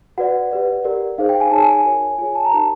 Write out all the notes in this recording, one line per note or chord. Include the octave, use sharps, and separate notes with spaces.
F#4 B4 D5 F#5
G4 B4 D5
G4 A#4 D5
D#4 G#4 C5 F5
G5
G#5
D#4 G#4 C#5 A5
G#5
F#4 A#4 C#5
F4 G#4 C#5 G#5
A5
A#5
D#4 G4 A#4 A5